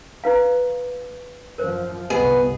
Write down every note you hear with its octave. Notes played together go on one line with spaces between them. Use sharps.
E4 B4 F5
F#2 F3 A#4 C5
G1 C2 B3 G#4 D#5 D#6